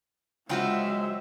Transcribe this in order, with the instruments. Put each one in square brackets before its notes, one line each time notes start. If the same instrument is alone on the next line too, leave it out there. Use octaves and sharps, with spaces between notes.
[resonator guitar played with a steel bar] C#3 F4 F#4 [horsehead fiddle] F#3 E5 [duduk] G#3 [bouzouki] C5 G5